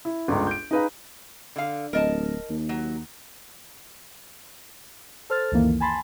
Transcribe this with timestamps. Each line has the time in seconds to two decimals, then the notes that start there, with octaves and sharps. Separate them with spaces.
0.05 E4
0.28 G1 C#2
0.47 G6 D7
0.71 D#4 G#4 B4 F5 A#5
1.56 D3 F5
1.93 D1 A#4 D#5 A5
2.50 D#2
2.69 F#3
5.30 A4 C5 F6 A6
5.52 C#2 F#2 D#3 E3 A#3
5.80 G#5 A5 B5 C6 A6